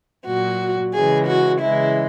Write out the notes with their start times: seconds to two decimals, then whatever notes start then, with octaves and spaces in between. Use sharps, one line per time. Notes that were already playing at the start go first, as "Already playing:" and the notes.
0.26 A#2 F#3 F#4
0.94 C#3 E3 G#3 G#4
1.27 F#4
1.61 C#3 E3 G#3 E4